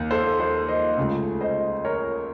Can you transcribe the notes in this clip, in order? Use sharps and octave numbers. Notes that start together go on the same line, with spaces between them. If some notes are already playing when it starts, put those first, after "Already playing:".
Already playing: D#2 D#3
A4 C5
A4 C5
C5 D#5
C#2 C#3 A3
C5 D#5
A#4 C#5